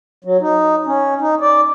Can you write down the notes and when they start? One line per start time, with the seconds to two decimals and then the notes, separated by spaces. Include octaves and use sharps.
0.24 F#3
0.41 D#4
0.87 C#4
1.21 D#4
1.41 D5